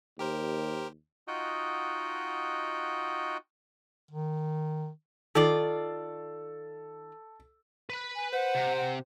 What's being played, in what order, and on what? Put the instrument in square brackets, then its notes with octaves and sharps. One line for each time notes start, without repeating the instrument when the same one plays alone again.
[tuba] D#2 [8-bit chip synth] G4 A#4 C5
[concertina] D#4 F4 F#4 D#5 F#5 G5
[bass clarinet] D#3
[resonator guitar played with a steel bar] D#3 F4 D5 [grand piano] A4
[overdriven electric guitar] B4 B5
[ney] G#5
[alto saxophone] C5 [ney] F#5
[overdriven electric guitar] C3
[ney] F#5